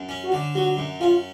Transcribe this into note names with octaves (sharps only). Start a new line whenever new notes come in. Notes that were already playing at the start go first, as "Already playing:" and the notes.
Already playing: F#2
C#4
F#4
D3
F#3 F#4
F#2
C#4 F4